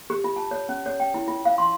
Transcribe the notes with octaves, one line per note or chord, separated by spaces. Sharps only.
G4
F4
A5
C#5
C#4
C#5
G5
E4
F4
F5
C6